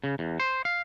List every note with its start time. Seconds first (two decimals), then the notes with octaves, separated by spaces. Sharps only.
0.04 C#3
0.19 E2
0.40 C5
0.65 F5